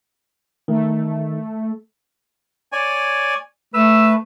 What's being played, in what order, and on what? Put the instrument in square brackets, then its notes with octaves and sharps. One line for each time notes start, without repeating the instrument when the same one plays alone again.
[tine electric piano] D#3 [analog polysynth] A3
[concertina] C#5 D5 G#5
[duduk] A3 [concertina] B4 [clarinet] E6